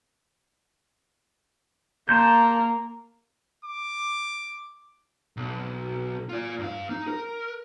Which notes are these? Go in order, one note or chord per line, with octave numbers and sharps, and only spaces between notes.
A#3 A5 C6 G6
D6
B1
F4 D5
G2 F5
D#4
A#4